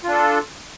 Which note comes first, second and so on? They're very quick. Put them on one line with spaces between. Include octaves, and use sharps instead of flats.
F4 D4 A4